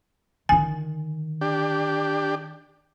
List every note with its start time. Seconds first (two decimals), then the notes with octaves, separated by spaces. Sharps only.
0.49 D3 D#3 G#5
1.41 D4 G4